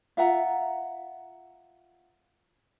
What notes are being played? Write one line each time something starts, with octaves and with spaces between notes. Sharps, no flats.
F4 E5 F#5 A#5